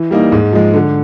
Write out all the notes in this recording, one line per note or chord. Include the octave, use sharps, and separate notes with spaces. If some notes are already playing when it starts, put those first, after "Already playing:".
Already playing: E3
G3 A#3 D#4
G#2
F3 G#3
D3